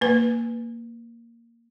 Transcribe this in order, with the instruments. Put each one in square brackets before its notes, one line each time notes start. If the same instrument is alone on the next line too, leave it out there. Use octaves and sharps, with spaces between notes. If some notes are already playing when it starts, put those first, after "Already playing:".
[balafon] A#3 B4